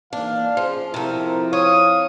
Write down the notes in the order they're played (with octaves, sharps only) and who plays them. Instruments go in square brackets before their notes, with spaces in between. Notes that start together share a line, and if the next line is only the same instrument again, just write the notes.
[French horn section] D#3 E3 A#3 [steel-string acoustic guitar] D4 [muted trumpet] F5
[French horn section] C#3 G#4 [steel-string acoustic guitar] F3
[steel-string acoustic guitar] C3 A3 [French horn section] F3 C4 E4 [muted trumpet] A#4
[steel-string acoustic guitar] C#5 [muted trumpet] F5 [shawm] D#6